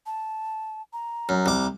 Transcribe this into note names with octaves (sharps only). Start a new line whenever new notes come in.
A5
A#5
F#2
C2 D6